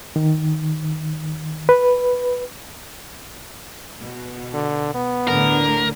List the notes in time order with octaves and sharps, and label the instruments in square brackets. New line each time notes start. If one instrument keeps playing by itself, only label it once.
[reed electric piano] D#3
B4
[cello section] B2
[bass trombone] D3
B3
[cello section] D2 A2 D3 [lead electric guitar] A#4